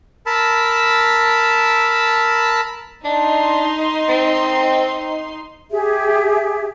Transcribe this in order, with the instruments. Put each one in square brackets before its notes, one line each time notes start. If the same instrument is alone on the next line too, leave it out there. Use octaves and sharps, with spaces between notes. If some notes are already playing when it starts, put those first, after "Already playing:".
[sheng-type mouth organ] A#4 A5 B5 E6
[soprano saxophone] D4 [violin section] D#4 C6
[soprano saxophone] C4
[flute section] G4 G#4 E5